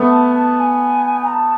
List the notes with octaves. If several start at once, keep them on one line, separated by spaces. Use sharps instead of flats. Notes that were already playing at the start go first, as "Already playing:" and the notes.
Already playing: A3 B3
A5
A5
G#5
A#5
A5